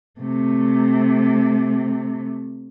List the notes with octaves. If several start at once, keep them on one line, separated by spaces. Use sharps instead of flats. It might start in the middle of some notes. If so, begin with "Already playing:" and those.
C3 A3